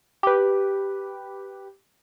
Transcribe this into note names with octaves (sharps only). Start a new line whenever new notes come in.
G4 B4